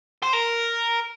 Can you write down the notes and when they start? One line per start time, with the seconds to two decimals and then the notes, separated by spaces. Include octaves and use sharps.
0.23 C5
0.33 A#4